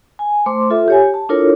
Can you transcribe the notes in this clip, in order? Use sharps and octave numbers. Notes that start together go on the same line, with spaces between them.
G#5
A3 C5 C6 D6
F4 A4 E5
G4 C#5 G#5
A5
D4 E4 F4 A4 A#4 C#5